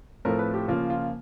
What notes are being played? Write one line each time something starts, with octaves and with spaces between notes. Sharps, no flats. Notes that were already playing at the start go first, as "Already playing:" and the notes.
A2 F3 A3 C4 A#4
B4
G4
C#3 F3 A#3 F4
F4